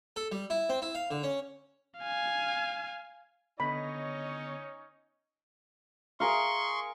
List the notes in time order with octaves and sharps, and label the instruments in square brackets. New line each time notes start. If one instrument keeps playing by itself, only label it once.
[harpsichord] A4
G3
E4
C4
E4
F5
D3
C#4
[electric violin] F5 G#5
[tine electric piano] D3 B3 [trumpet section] C#4 D#4 C#5 [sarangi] D#5 [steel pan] B5
[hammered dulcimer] G#4 A#4 F5 [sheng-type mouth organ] C6 C#6